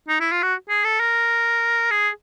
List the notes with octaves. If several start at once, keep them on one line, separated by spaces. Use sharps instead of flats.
D#4
E4
F4
F#4
G#4
A4
A#4
G#4